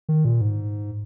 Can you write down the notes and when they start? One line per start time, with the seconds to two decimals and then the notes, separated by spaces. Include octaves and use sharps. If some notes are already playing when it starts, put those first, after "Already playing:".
0.09 D#3
0.25 A#2
0.41 G#2